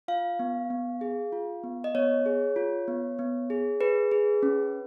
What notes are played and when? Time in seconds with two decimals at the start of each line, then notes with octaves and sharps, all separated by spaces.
0.08 F4 F5
0.39 B3
0.70 B3
1.01 G#4
1.32 F4
1.64 B3
1.84 D#5
1.95 B3 C#5
2.26 G#4
2.56 F4
2.88 B3
3.19 B3
3.50 G#4
3.81 G#4 B4
4.12 G#4
4.43 C#4